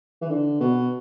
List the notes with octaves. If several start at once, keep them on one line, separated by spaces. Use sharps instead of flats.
E3
D3
B2